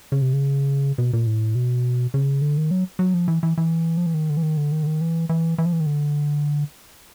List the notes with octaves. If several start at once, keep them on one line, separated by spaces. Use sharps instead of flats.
C#3
C3
C#3
B2
A#2
A2
B2
C#3
D3
D#3
F#3
F#3
F3
E3
E3
E3
F3
E3
D#3
D3
E3
D#3
D3
D#3
D3
D#3
E3
E3
E3
F3
E3
D#3
D3